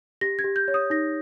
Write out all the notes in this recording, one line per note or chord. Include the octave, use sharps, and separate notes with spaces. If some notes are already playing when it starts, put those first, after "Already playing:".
G4 A#6
G#6
G4
G6
C#5
D#6
D#4 A#6